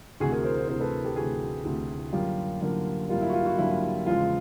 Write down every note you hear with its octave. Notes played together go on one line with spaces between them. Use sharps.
D2 C3 E3 F#4 G#4
G#4 A#4
A#4 C5
A#4 C5
D2 C3 E3 A#4 C5
A4 B4
G4 A4
D2 C3 E3 F#4 G#4
D2 C3 E3
F#2 D3 G3 A#3 F4 G4
F#2 D3 G3 A#3 F4
F#2 D3 G3 A#3 F4
E4
F#4
F4
E4 F#4
F#2 D3 G3 A#3 E4
E2 C#3 F3 G#3 F4